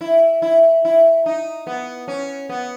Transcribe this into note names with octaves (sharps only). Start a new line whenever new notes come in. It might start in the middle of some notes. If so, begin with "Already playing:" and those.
E4
E4
E4
D#4
B3
C#4
B3